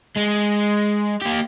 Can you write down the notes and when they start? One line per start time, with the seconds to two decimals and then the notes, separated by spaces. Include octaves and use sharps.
0.16 G#3
1.21 A#3 G4